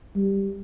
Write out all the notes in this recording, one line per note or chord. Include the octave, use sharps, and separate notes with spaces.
G3